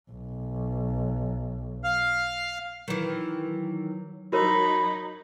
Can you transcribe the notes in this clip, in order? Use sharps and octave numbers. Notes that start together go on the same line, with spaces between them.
B1
F5 F6
D#3 E3 F#3
F#3 D#4 F#4 A#4 C#5 B5